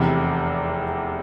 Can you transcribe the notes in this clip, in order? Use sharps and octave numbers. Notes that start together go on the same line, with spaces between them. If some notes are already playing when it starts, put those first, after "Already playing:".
Already playing: F1 E2 C3